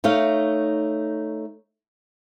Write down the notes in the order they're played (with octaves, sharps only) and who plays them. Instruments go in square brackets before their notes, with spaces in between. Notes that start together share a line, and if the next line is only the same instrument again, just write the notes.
[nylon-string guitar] A3 D#4 C#5 F5